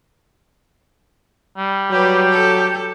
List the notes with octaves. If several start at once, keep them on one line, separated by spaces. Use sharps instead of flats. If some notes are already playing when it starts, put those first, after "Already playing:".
G3
F#3 G4 B4
A4